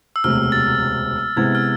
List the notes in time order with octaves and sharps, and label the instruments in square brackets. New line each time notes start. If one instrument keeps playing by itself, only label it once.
[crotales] E6
[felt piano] E1 D2 C3 [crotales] F6
[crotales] A6
[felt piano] C3 G#3 B3 E4 [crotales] G#6
[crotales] F6